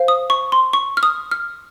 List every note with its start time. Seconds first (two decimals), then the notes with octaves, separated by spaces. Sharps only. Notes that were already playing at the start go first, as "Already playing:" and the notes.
Already playing: C5 F5
0.08 D#6
0.30 C#6
0.52 C6
0.73 C#6
0.97 F6
1.03 D#6
1.31 F6